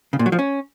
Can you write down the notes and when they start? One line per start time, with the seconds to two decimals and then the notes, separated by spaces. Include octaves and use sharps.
0.13 C#3
0.19 A#2
0.26 F#3
0.32 F3
0.39 C#4